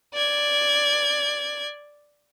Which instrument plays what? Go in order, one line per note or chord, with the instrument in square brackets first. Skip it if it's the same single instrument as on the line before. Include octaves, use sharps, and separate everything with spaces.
[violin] D5 G#6